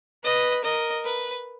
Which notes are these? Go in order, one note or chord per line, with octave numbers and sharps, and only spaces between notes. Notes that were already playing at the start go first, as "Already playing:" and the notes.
B4 D#5
A#4 D#5
B4